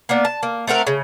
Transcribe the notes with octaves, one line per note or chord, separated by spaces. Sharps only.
A#3 B3 D4
A5
A#3
A3 C4 F#4 A#4
C#3